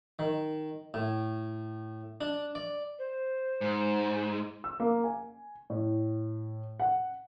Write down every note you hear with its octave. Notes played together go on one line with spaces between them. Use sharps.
D#3
A2
D4
D5
C5
G#2
E6
A#3
G#5
A2
F#5